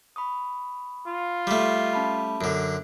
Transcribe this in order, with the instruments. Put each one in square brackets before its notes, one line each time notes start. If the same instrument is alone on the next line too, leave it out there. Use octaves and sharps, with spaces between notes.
[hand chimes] B5 C#6 D#6
[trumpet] F4
[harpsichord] G3 A3
[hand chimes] C#4 A5 B5
[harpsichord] F#2 D3 [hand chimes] D7